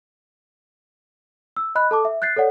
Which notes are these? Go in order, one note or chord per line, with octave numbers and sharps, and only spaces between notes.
E6
D#5 B5 F#6
A4 A5 D6
E5
F#6 G6 A6 C7
A4 C#5 D5 F#5